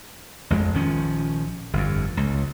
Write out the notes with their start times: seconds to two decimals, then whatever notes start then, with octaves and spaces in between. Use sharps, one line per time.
0.50 A1 F2 G#3
0.74 A#1 D#3 F3 C#4
1.73 G1 F2
2.17 C#2